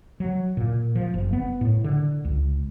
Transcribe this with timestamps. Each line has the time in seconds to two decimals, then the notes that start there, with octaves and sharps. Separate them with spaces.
0.20 F#3
0.57 A#2
0.95 F3
1.14 F#1
1.33 B3
1.61 A2
1.84 D3
2.25 C#2